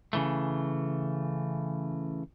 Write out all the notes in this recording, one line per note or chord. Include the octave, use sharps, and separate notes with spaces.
C#3 E3 A3